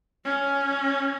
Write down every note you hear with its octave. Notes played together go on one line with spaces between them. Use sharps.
C#4